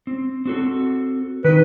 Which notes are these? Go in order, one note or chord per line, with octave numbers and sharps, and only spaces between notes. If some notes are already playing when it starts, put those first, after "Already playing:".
C4
C4 F#4 A4
D#3 D#4 B4